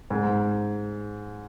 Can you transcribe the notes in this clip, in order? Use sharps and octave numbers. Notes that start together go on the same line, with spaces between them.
G#2